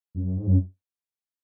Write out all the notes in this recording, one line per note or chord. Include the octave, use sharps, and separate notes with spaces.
F#2
G#2
F#2